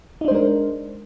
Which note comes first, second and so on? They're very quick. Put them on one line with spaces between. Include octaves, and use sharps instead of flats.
D#4 D4 C5 G#3 A#4